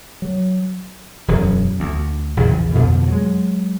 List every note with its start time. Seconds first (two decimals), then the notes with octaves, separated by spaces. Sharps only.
0.22 F#3
1.28 E1 F#2 F#3
1.80 D2
2.37 A#1 E2 C#3
2.75 F2 B2 D3 F3
3.08 F#3 G#3